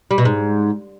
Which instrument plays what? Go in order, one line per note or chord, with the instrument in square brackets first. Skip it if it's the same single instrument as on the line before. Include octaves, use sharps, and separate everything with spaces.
[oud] G3
B2
G#2